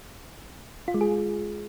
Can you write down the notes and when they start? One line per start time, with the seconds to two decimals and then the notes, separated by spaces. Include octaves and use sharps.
0.88 F4
0.94 G#3
1.01 G#4